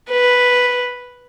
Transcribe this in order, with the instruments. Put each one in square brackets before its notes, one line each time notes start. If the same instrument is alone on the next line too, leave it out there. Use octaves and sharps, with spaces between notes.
[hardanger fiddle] B4